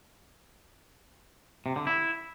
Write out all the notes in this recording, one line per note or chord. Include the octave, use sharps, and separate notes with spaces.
C3
D3
E4